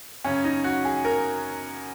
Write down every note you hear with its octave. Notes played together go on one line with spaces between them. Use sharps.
F#2 C#3 C#4
D#4
F#4
G#4
A#4